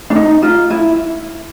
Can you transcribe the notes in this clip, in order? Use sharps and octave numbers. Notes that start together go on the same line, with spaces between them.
D4
D#4
F4
E4